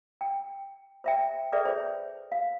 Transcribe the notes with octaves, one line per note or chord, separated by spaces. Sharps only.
G5
C5 E5 G5
G#4 A4 B4 D5 E5 G5
C5 C#5
F5